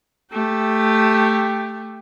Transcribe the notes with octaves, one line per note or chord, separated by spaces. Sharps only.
A3 G4